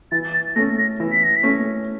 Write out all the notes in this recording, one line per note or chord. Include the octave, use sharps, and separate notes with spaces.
E3 A6
A6
A3 C#4 A#6
A#6
E3
B6
A#6
B6
A3 C#4